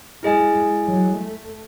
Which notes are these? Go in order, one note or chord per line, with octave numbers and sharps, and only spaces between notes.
G#3 E4 G#4 D#5 G#5
F#3
A3